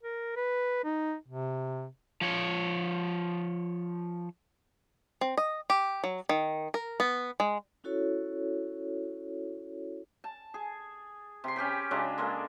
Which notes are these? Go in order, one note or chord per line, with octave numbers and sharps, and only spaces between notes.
A#4
B4
D#4
C3
F3 C#5
C4
D#5
G4
F#3
D#3
A#4
B3
G#3
C#4 E4 F#4 A4 C#5
A5
G#4
C3 C6
C#4 G4 G5 B5
C#3 F#3 G#3 D4
G#3 A#3 A4